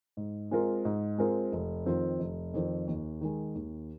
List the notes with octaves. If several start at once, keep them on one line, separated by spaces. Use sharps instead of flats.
G#2
G#3 C4 F4 A#4
G#2
G#3 C4 F4 A#4
F1
F2 D#3 C4 F4
F1
F2 D#3 C4 F4
D#2
D#3 G#3
D#2